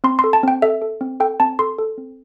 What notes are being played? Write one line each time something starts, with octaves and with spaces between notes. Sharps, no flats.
C4 C6
C6
A4
A5
C4 G5
A4 E5
A4
C4
A4 G5
C4 A5
A4 C6
A4
C4